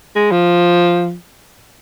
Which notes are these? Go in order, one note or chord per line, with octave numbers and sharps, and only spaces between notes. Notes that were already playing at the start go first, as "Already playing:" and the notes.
G#3
F3